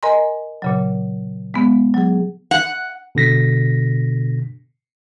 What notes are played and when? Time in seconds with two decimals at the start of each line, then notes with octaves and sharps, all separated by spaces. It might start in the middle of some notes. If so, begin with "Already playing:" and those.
0.03 A#4 D#5 G#5 A#5 C6
0.62 A#2 C#3 F#3
1.54 G#3 B3
1.94 F#3 G#4
2.51 F#5
3.15 B2 D3 A#6 B6